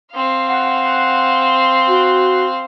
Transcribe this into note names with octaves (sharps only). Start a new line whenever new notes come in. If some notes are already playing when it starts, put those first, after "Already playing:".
C4 F5
F#5
F#4